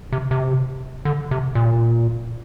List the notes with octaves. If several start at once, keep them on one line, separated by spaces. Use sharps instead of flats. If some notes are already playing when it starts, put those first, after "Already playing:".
C3
C3
D3
C3
A#2